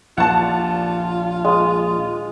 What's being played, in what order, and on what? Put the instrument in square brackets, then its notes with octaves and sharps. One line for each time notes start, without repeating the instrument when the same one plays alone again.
[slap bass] A#1 D#2 A#2 [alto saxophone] F4 [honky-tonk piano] F#5 A5
[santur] G#3 D#6